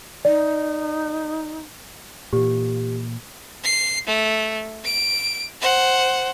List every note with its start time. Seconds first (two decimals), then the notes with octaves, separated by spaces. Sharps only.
0.25 D#4 D5
2.33 A#2 E3 G4
3.64 C7
4.07 A3
4.84 D7
5.62 C5 F#5